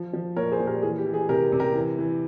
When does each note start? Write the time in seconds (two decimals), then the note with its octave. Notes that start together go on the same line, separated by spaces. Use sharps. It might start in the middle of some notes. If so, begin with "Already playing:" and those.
Already playing: F3
0.13 F3
0.36 A#2 A#4 C#5
0.52 G#4 C5
0.60 A#2
0.67 G4 A#4
0.82 E3 G#4
0.98 G4
1.06 E3
1.14 G#4
1.29 C3 G4 A#4
1.52 C3
1.59 G4 A#4
1.75 E3
1.99 E3